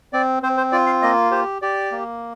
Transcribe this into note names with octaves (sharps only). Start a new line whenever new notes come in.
C4 D5
C4 C5
C5
F4 D5
F5
A#3 D#5
G4 C5
G4 D5
A#3